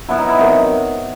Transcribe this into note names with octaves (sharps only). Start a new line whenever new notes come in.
B2 F#3 E4
D#4
E4
C3 D#3 F#3 D#4
D#4